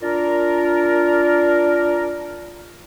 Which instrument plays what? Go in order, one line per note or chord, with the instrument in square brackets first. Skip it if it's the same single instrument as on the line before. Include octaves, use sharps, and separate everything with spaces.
[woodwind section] D4 F4 A#4